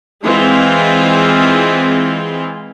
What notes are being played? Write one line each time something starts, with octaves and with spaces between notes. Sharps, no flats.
E3 G#3 C4 F4